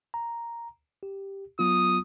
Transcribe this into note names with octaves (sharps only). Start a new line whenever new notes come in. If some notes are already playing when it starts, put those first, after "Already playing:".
A#5
G4
F#3 B3 F4 D#6